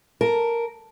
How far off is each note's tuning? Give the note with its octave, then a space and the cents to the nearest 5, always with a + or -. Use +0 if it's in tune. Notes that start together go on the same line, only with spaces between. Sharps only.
A#4 +0 A5 +0